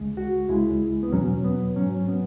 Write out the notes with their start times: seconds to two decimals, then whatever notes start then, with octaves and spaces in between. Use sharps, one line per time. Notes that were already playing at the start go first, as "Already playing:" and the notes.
Already playing: C#2 C#3 G#3
0.17 F#4
0.49 C#2 C#3 G#3 E4
1.03 B3
1.12 E2 B2 F#3 C#4
1.44 B3
1.76 G#2 F#3 C#4
2.08 B3